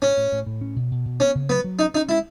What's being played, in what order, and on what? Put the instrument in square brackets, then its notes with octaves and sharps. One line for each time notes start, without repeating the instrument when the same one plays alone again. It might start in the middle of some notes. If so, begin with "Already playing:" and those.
[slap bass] A2 [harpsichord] C#4
[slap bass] A2
A2
A2
C#4
B2
B2
B2
[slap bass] B3 [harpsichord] C#4
[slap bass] C#3
[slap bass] F#3 [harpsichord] B3
[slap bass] F#3
[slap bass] C#4 [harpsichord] D#4
[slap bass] C#4 [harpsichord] D#4
[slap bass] G#3 [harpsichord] E4